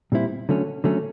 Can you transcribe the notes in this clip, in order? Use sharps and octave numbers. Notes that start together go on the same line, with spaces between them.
A#2 G3 C4 E4
D3 F#3 A3 C#4
D3 F#3 A3 C#4